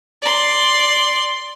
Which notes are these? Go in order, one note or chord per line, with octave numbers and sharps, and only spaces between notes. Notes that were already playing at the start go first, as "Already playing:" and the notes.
D5 C6